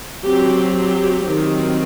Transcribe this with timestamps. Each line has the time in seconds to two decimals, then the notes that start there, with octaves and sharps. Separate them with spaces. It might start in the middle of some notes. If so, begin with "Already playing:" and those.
0.25 F#3 C4 G4
0.75 G4
1.25 D#3 F#3 C4